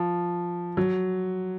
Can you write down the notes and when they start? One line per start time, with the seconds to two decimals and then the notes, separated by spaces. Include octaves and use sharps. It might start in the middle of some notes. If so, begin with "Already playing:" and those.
Already playing: F3
0.77 F#3